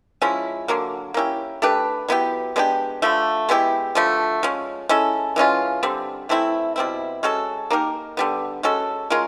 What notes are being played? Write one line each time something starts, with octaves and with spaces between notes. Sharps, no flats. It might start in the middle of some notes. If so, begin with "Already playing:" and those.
F3 G#3 C#4 E4
D3 F#3 A#3
A#3 C#4 E4 G4
A3 D4 G4 B4
F#3 B3 E4 G4
G#3 B3 D4 G4
D3 F3 A3
G#3 B3 E4 G4
D3 F3 A3
F3 G#3 C#4
G#3 C#4 E4 A4
E3 G#3 C#4 F4
D3 G3 C4
E3 A3 C4 E4
B2 G3 C4 E4
G#3 C#4 F#4 A4
A#3 D#4 G4 A#4
D3 G3 B3
G#3 C#4 F#4 A4
G#3 C#4 F4 A#4